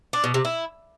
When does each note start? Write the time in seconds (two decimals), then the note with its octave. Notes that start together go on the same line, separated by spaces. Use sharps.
0.13 D4
0.24 B2
0.34 C3
0.45 E4